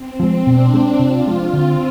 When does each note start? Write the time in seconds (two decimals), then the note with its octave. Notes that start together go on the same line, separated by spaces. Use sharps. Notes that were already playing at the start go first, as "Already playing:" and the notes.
Already playing: C4
0.20 F3 G#3
0.46 B2 D4
0.74 G#3 C4
0.99 C3 F4
1.27 F3 G#3
1.53 D3 C4